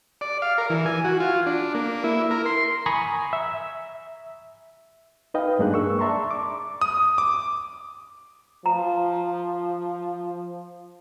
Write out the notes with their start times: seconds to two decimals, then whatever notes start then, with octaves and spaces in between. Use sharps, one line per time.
0.21 D5
0.42 F5
0.58 A#4
0.70 E3
0.86 G#5
1.04 F#4
1.20 F4
1.46 D4
1.75 A#3
2.04 E4
2.31 A#4
2.46 C6
2.86 G#5 A#5 B5 C#6 D#6
3.33 E5
5.34 D#4 B4 D#5 F5 G5
5.59 G2 G#3 A#3 D4 G#4 F#6
5.74 C#6 E6
5.99 D5 E5 A5 A#5 C6 C#6
6.31 D6
6.81 D#6
7.18 D6
8.66 F3 A#5